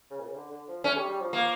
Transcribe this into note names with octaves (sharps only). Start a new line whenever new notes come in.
C#3
A#2
C#3
D3
D3
F3
A3 C#4
G3
G3
F3
A#3